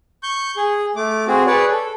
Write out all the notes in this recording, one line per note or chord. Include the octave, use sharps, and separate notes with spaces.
C#6 G6
G#4
A3 D6
C4 F#4 G#4
G#4 B4 C#5 D5
A4